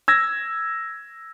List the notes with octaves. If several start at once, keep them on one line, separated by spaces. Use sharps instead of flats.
E6 G#6 A#6